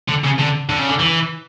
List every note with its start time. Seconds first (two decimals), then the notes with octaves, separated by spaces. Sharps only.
0.09 D3
0.24 C#3
0.39 D3
0.70 D3
0.79 C#3
0.89 D3
1.00 E3